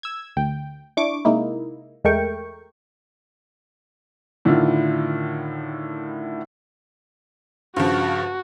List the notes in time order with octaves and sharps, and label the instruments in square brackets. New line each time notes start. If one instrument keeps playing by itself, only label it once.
[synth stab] E6 G#6
D2 G5
D4 E4 C#6 D6
C3 G#3 A#3 D#4 E4
E2 G#3 A3 A#4 G5 C#6
[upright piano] A2 D3 D#3 E4 F4
[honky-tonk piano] G2 C#3 F3 [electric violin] F#4